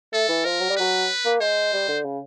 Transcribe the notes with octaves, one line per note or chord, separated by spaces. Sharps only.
A3 A4
E3
F3 A#4
F#3
G3
F#3 B4
A#3
G#3 C5
G3
D3
C#3